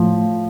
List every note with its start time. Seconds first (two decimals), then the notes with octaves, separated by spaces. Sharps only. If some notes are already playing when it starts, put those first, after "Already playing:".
Already playing: A2 F3